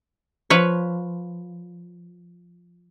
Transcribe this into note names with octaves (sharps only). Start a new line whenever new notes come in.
F3 B4 C#5